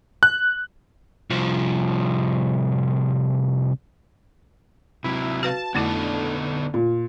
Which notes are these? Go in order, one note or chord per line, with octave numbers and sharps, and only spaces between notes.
F#6
C2 F3
C3 F#3 E4
F#4 B4 F5 A5
F2 D3 A3 B3 D#4 E4 A4
A#2